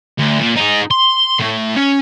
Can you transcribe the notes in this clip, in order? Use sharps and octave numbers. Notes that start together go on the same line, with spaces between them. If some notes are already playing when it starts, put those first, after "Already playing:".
D2
A#2
D#4 G#4
C6
A2 A3
C#4